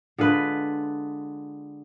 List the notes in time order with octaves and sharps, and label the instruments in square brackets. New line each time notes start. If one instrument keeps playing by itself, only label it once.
[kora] D3 G#3 F4 B4